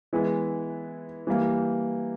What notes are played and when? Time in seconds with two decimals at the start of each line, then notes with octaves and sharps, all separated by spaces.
0.13 E3 G#3 B3 E4
1.27 E3 G3 A#3